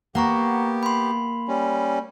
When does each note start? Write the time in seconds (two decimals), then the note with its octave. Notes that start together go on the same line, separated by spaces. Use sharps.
0.15 A#3 B3 G4 F#5 A#5 C#6
0.83 B5 C6
1.48 G3 C#4